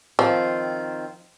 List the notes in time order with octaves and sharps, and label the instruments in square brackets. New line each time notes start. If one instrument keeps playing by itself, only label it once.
[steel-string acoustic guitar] D#3 C4 F4 [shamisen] F3